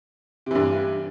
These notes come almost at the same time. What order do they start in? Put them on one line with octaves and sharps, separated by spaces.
C3 E3 G2